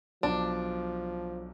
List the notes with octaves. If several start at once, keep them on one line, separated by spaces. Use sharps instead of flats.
B1 F3 D4